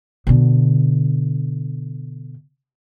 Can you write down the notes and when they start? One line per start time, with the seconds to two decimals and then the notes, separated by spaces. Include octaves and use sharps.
0.27 B2 D3